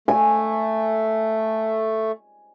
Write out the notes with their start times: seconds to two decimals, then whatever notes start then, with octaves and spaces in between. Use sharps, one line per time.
0.08 A3 G#5